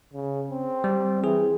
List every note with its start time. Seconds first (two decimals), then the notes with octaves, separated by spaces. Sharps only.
0.14 C#3
0.51 C4
0.84 G3
1.24 E3 G#4